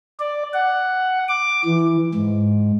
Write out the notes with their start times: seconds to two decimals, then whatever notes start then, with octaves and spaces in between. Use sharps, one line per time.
0.20 D5
0.53 F#5
1.28 D6
1.65 E3
2.15 G#2